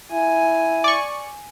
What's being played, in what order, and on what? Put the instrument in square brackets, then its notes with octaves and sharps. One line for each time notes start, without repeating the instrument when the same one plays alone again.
[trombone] E4 [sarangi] G#5
[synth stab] D5 C#6